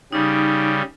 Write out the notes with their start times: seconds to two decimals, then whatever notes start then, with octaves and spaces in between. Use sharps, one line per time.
0.12 C#3 G3 D#4